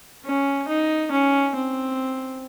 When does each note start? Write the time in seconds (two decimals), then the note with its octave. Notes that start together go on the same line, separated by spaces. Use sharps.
0.25 C#4
0.68 D#4
1.11 C#4
1.55 C4